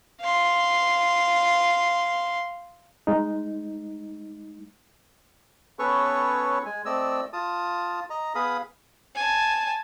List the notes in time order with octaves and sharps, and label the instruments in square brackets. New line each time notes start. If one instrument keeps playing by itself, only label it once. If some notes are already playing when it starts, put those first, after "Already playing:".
[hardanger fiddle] F5 C6
[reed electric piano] G#3 D#4
[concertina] B3 C#4 A4 B4 C#5 C#6
G#3 G#5
A3 C4 D5 D#5 E6
F4 A5 D#6
D#5 A#5
B3 G#4 F5 B5 D#6
[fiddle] G#5 A5